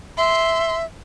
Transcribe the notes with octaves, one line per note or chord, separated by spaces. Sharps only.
E5 C6